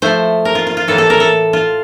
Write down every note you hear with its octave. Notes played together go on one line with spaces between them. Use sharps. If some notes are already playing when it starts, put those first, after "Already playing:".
F3 A3 E4 C5
A#4
F4
F4
F4
A2 E3 A#3 A4
A4
A#4
A4
F4